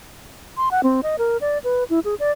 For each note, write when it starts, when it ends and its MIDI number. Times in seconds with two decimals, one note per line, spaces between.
0.57 0.69 84
0.71 0.81 78
0.83 1.01 60
1.03 1.16 75
1.18 1.37 70
1.41 1.58 74
1.64 1.84 71
1.90 2.00 64
2.05 2.15 68
2.20 2.32 74